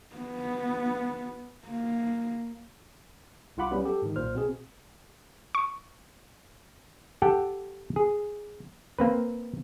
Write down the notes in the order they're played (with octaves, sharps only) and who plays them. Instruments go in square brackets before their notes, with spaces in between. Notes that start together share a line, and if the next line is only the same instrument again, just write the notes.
[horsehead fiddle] B3
A#3
[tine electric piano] C2 E4 F4 F#5 B5 D6
F#3 G3 B3 C#4
G4 A4
G#2 D#3
B1 A#2 C5 F6
B2 C4 G#4
[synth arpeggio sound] C#6
[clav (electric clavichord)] G4 A4 F#5 G5 A5
G#4
A#3 C4 B4